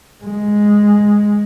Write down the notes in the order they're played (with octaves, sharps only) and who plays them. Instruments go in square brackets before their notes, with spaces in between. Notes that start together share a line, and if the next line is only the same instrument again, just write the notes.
[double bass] G#3